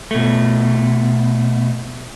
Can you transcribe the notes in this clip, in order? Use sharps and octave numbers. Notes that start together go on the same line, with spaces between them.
B2 A3